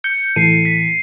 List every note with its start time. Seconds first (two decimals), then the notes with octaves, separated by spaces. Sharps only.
0.04 G6 C#7
0.36 A2 E3 A4 C7 D#7
0.65 B6